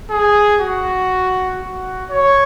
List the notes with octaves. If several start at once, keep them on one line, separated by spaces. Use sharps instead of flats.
G#4
F#4
F#4
C#5